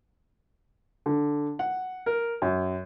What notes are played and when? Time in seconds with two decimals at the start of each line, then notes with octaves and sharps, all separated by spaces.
1.06 D3
1.59 F#5
2.06 A#4
2.42 F#2